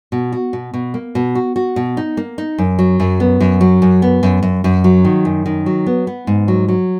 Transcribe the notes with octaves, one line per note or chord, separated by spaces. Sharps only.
B2
F#4
B2
B2
A#3
B2
F#4
F#4
B2
D#4
A#3
D#4
F#2
F#3
F#2
B3
F#2
F#3
F#2
B3
F#2
F#2
F#2
F#3
D#3
F#2
D#3
F#3
B3
B3
G#2
F#3
F#3